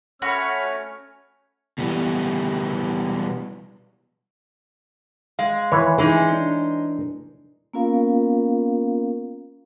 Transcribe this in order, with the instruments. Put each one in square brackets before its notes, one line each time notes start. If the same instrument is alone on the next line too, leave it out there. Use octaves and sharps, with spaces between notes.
[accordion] A3 C#4 C#5 [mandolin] F#4 F#5 B5 [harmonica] F6
[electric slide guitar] B2 E3 G3 A#3 B3
[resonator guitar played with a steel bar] G#3 [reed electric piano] F5
[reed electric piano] D#3 [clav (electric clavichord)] E3 B4 C#5
[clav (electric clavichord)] E3 [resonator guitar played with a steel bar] G#3 C#4 D#4 [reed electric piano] G#4
[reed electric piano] D4
[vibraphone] A#3 B3 C#4 F4 A#4 F5